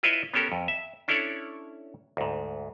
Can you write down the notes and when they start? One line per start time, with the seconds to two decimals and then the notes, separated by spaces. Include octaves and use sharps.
0.03 E4 F4 B4 C#5 D#5 E5
0.34 B3 C#4 G4 A4 A#4
0.52 F2
0.68 E5
1.08 C#4 D4 E4 A4 C#5 D5
2.17 D2 G#2